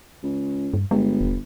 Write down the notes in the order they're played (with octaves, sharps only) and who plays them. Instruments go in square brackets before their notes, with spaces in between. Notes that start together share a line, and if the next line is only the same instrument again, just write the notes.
[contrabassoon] C#2
[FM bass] G2
[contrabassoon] G1 [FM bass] G#3
[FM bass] E1